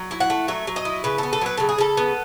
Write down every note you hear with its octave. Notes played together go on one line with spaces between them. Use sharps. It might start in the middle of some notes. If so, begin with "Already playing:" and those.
Already playing: F#3
E4
F#5
A3
F#3 E5
F#3
D#5
E4
C#3 B4
B3 A4
A4
F#3 B4
C#3 A4
G#4
C#3 A4
B3